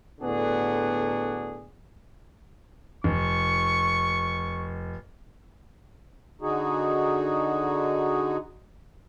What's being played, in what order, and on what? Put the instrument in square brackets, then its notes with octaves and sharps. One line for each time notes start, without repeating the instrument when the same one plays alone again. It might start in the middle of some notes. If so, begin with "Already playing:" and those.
[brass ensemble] A2 D3 B3 D4 F#4 G#4
[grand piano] F1 [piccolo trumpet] C#6
[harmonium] D3 D#4 F#4 G#4